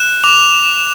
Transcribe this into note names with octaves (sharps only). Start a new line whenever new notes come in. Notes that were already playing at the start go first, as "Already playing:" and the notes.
Already playing: F#6 E7
D6 F7